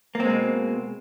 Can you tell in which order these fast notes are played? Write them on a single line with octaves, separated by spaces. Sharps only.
A#3 C4 G#3 B2